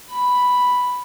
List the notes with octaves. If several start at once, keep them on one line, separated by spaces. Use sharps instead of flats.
B5